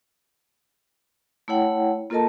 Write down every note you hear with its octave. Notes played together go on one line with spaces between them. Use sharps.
A3 E4 C#5 F#5 G5
A#3 F4 A4 A#4 D#5 A5